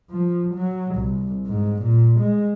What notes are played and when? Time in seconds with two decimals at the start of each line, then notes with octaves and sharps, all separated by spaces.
0.11 F3
0.55 F#3
0.96 C2
1.47 G#2
1.82 A#2
2.20 G#3